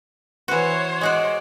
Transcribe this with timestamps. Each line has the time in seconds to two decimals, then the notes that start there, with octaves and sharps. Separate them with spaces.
0.48 E3 F#4 C5 C#5
1.01 G#3 F#4 D5 D#5